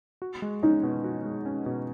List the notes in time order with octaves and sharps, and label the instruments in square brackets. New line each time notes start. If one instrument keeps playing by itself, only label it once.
[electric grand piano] F#4
G#3
[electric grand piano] C#4 [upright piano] D#4
[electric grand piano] B2
F#4
G#3
C#4
B2